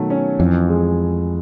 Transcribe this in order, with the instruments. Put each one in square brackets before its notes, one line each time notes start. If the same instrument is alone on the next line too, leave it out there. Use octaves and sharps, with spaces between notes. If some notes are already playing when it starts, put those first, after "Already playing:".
Already playing: [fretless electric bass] B2 [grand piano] D#3 F#3 A3
[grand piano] C#4
[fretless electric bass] F2 [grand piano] E3
[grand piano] G#3